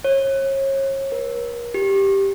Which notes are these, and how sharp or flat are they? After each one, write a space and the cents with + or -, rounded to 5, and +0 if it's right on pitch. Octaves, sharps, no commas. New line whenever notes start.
C#5 -35
A#4 +35
G4 +0